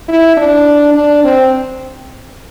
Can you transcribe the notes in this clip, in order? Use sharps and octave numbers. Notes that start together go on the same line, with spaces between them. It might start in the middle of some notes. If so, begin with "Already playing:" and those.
E4
D4
D4
C4